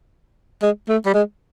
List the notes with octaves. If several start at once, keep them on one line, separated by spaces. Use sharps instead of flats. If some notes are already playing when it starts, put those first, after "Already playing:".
G#3
A3
G3
G#3